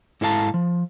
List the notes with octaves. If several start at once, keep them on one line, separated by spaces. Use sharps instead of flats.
G#2 E4 A4 F5 A5 A#5
F3